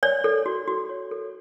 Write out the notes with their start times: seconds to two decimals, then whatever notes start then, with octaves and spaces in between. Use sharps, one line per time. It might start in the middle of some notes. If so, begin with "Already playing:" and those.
0.03 C#5 D5
0.24 A4
0.46 F#4
0.68 F#4
0.89 C#5
1.11 A4